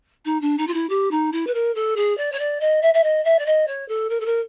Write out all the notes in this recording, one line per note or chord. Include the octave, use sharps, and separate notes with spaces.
D#4
D4
D#4
F4
E4
G4
D#4
E4
B4
A#4
A4
G#4
D5
C#5
D5
D#5
E5
E5
D#5
E5
D5
D#5
C#5
A4
A#4
A4
A#4